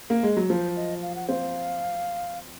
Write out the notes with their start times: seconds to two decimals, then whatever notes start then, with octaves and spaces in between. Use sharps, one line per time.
0.10 A#3
0.23 G#3
0.37 F#3
0.50 F3 C5
0.76 D#5
1.02 F5
1.15 F#5
1.29 C4 F5